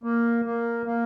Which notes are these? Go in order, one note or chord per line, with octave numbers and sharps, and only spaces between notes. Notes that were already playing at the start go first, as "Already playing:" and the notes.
A#3
A#3
A#3